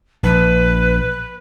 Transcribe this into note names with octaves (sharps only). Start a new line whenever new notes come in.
A#1 B4